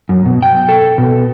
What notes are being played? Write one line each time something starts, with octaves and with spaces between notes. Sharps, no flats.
F#2
B2
G5
A4
B2